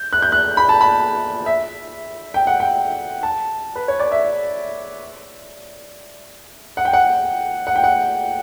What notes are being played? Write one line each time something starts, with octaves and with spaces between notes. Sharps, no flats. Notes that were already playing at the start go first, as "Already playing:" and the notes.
Already playing: G6
F#6
G6
F#6
B5
A5
B5
E5
G5
F#5
G5
A5
B4
C#5
D5
E5
F#5
G5
F#5
F#5
G5
F#5